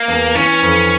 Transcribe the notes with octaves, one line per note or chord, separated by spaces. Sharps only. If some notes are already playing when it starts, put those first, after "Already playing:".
Already playing: A#3
E2
E3 C#4
F2